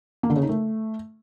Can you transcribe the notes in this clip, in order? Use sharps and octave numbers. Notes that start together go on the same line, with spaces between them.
A#3
D3
C#3
D#4
A3